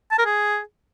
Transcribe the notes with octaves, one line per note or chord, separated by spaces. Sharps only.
A5
A#4
G#4